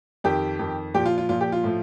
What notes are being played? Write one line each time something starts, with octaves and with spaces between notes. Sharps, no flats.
F2 D#3 G4
F2 D#3
A#2 F3 G4
F4
F4
A#2 F3 F4
G4
F4
A2 F3